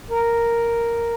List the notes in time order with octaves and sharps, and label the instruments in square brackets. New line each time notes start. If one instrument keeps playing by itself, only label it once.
[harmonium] A#4